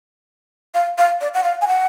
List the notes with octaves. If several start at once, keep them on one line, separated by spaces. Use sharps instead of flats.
F5
F5
D5
F#5
F5
G#5
F#5